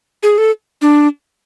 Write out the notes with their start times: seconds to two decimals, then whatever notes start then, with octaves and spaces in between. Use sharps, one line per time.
0.23 G#4
0.38 A4
0.82 D4